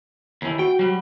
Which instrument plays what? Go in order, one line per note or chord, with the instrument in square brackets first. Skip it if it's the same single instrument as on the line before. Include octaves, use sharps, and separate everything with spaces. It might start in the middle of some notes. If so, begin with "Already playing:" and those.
[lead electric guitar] D#2 E3
[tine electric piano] F#4 [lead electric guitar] G5
[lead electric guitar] F#3 G3